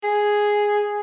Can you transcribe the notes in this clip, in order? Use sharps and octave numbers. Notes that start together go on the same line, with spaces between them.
G#4